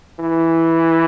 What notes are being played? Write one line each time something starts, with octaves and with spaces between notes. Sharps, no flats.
E3